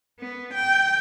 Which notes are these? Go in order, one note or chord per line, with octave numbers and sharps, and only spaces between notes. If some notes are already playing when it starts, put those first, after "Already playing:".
B3
G5